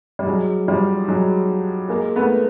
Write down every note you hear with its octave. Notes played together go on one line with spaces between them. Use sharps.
G3
F#3 G#3
F3 G3
F#3 G#3
G#3 A#3
A3 B3